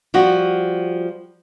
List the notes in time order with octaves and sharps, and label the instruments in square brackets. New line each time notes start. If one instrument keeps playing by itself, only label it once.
[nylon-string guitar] F3 G3 F#4